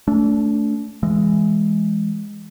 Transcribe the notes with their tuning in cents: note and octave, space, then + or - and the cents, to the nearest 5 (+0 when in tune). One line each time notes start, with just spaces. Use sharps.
A3 +0 D4 -35
E3 +20 G#3 +0